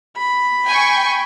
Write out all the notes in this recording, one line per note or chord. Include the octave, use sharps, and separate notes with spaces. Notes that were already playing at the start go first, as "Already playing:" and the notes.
B5
G5 G#5 C#6